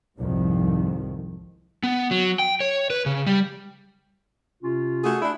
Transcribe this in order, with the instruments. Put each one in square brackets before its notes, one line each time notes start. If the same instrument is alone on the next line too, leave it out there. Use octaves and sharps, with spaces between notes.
[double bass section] C2 F2 G#2 D#3 F3
[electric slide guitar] B3
F#3
G5
C#5
B4
C#3
G3
[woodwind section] C3 C#4 F4
[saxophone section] A3 F#4 G#4
D4 E4